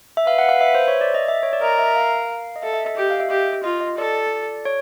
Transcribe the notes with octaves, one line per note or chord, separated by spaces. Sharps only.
E5
B4 F5
F#5
F5
E5
C5
C#5
D5
D#5
E5
C#5
D5
A#4 D#5
E5
F5
D#5
A4 E5
E5
D#5
G4 D#5
F5
E5
G4 D#5
F4 D#5
D#5
A4 D5
C#5